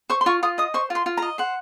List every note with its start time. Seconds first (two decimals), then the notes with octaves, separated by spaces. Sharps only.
0.10 C5 C#6
0.21 C6
0.26 F4 C#6
0.43 F4 D#6
0.58 D#5 D#6
0.74 C5 C#6
0.90 F4 C6
1.06 F4
1.17 A#5
1.22 D#5
1.38 C5 F#5